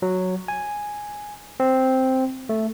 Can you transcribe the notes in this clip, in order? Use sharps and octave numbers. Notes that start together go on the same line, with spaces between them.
F#3
G#5
C4
A3